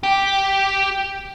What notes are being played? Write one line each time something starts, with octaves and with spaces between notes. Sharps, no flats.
G4